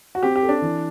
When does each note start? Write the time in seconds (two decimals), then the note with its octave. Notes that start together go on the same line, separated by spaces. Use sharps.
0.15 F#4
0.23 C4 G4
0.36 G4
0.43 A4
0.49 D4
0.62 E3